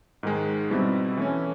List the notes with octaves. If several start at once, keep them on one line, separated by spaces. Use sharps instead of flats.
G#2 D#3 G#3
B2 G3 C4 E4
E3 A3 C#4